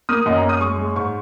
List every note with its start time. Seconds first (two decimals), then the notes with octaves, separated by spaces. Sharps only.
0.09 A#3 D#6
0.26 F#2 D#5
0.38 A#5
0.43 F#2
0.49 D#6
0.60 G#3 C#6
0.78 G#3
0.95 G#2 C#6